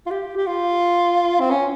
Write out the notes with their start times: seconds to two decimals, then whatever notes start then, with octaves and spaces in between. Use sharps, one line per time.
0.07 F4
0.11 G4
0.37 G4
0.47 F4
1.40 C4
1.51 C#4